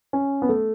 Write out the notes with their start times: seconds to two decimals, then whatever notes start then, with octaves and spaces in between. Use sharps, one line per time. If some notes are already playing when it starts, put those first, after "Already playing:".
0.13 C#4
0.42 B3
0.49 A3